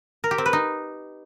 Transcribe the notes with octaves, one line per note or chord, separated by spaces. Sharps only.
A#4
G4
C4
B4
D#4